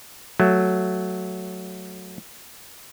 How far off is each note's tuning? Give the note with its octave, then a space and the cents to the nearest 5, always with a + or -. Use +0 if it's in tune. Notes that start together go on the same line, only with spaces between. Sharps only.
F#3 +0 A3 +0